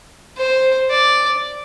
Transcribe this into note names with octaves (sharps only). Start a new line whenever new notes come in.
C5
D5